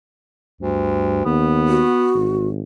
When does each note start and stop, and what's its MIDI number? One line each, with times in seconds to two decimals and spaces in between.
0.61 1.24 38
0.61 1.25 43
1.25 1.85 39
1.25 2.21 59
1.68 2.48 66
2.15 2.61 32